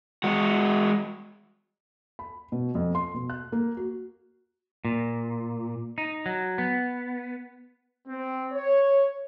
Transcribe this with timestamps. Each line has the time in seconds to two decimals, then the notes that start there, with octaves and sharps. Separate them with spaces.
0.24 G#3 F#4
2.19 B5
2.52 B2
2.75 F2
2.95 C6
3.14 B2
3.30 F#6
3.52 A#3
3.77 F#4
4.85 A#2
5.98 D#4
6.26 F#3
6.58 B3
8.07 C4
8.52 C#5